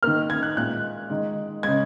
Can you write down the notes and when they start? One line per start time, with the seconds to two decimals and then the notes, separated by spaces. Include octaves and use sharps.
0.03 D#3 A#3 F6
0.30 G#6
0.43 F#6
0.56 A#2 G#3 F#6
1.10 D#3 G#3
1.63 C#3 G#3 G#6